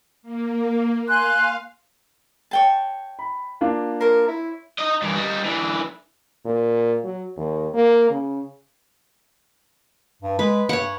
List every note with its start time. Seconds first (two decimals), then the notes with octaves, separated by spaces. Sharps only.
0.22 A#3
1.08 F5 G#5 C6 F#6
2.51 C#5 G5 A5
3.19 B5
3.61 A#3 D4 F4
4.01 A#4 C5 C#5
4.28 E4
4.78 D#4 D#5
5.02 G2 E3
5.16 G3 D#4
5.45 D3 E3
6.45 A#2
7.04 F#3
7.37 D#2
7.74 A#3
8.10 C#3
10.22 G2
10.39 G#3 B4
10.69 G2 C#5 F#5